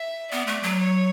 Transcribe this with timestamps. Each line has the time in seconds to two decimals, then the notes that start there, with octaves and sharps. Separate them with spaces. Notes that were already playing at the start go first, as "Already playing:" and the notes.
Already playing: E5
0.31 B3 D5
0.47 A3
0.63 F#3
0.79 C#5